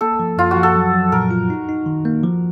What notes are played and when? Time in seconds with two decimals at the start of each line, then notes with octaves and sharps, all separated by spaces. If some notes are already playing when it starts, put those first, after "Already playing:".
0.01 A#3 A4
0.20 F3
0.38 F#2 F4
0.51 F#4
0.56 F3
0.63 A4
0.76 F#3
0.94 F#3
1.12 A#2 A#4
1.31 F4
1.50 D#4
1.69 D#4
1.86 D#3
2.05 A#3
2.24 F3